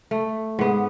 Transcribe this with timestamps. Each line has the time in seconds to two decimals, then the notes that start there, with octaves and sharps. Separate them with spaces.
0.11 A3
0.59 G#2 B3